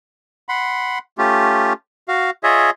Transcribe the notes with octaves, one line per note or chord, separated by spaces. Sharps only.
F#5 B5 C6
A3 C#4 F4 G4
F#4 F5
F4 G#4 C#5 D#5 E5